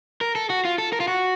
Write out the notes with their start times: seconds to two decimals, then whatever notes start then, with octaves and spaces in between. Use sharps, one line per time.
0.21 A#4
0.35 A4
0.50 F#4
0.65 F4
0.78 A4
0.93 A#4
1.00 F4
1.08 F#4